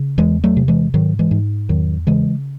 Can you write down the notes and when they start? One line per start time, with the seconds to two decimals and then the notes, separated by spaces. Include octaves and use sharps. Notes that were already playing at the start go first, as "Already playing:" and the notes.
Already playing: C#3
0.18 E2 E3 G#3
0.44 F#3 A3
0.57 C3
0.68 E3 G#3
0.94 G#2 D#3 F#3
1.19 E3 G#3
1.31 G#2
1.69 E2 D#3 F#3
2.07 C#3 E3 G#3